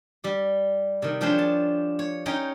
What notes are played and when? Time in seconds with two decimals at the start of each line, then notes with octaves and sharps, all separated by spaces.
0.24 G3 G4
1.02 C3 D#3
1.21 F3 D4 G4 G#4 C5 C#5
1.38 A5
1.99 C#5
2.26 C#4 D#4 C#5 G5 A#5